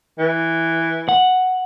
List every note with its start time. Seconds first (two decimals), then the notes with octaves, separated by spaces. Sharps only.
0.19 E3
1.09 F#5